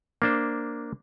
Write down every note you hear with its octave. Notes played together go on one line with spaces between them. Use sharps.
A#3 D4 C5